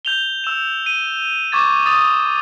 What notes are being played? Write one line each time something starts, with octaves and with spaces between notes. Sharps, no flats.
G6 F7 G7
E6 E7
D#7
C#6 D6 G#6 A6
D#6 A6